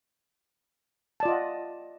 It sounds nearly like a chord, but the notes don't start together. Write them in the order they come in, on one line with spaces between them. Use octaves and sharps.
A5 D5 F4 D#5 F#5